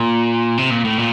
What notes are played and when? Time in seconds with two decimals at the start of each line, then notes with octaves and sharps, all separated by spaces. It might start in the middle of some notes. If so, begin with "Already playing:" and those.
Already playing: A#2
0.58 C3
0.71 A#2
0.85 A2
0.98 A#2